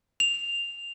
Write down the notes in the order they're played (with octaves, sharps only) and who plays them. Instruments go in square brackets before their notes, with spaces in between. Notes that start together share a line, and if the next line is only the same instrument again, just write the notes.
[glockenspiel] F7